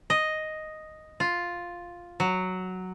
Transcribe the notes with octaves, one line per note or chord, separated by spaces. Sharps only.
D#5
F4
F#3